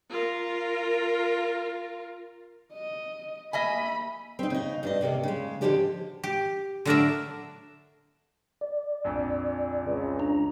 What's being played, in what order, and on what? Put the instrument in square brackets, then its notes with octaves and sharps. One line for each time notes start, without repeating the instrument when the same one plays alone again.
[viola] F4 A#4
[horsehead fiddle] D#5
[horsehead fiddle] A#3 B5 [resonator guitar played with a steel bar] D#5 E5 G#5
[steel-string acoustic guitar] C4 D#4
C#3 D#4
G2 D4 D#5
D#2 C3 A#3 A4
C#3 G#3
D3 F3 G#3 C4 G4 A5
[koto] G4
D3 F#3 D4 A#4 D5 E5
[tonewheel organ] D5
[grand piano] A#1 F2
[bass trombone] C#2
[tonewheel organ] D4 A#5